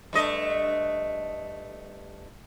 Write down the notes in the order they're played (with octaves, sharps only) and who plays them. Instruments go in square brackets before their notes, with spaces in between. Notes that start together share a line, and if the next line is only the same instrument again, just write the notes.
[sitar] G2 A3 D#5